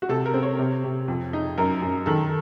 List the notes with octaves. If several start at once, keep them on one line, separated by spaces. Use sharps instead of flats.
F#4
C3 A4
A#4
C4
C#5
C3
C3
F2
D#4
F#2 A#4
F#2
D#3 A4